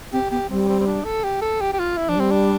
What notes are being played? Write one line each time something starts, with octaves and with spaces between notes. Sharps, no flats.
C4 G4
B3 G4
G3 C4
C4
C4
D4
A4
G4
A4
G4
G4
F4
E4
F3 D4
G3 C4
D4